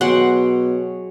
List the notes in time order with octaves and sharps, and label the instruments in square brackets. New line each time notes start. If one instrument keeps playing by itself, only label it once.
[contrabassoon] B2 [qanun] F#3 G5 C6 [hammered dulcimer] G#4 C#5 [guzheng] F#5